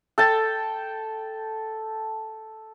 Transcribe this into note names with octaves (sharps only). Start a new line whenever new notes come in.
A4 G5 A5